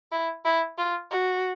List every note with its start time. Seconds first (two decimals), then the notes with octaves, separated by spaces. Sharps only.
0.12 E4
0.45 E4
0.78 F4
1.12 F#4